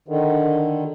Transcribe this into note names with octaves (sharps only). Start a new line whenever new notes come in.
D3 D#3